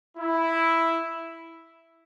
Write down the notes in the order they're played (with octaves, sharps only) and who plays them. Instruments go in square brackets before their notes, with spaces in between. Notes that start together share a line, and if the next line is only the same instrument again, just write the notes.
[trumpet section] E4